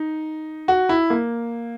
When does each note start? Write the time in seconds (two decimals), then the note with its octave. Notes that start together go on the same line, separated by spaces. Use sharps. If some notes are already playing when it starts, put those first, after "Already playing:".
Already playing: D#4
0.68 F#4
0.89 E4
1.10 A#3